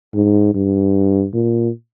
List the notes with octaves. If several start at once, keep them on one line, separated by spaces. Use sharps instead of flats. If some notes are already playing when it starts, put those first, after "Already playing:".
G#2
G2
A#2